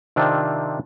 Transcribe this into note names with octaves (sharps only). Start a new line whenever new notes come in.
C3 D#3 C4 D4 F4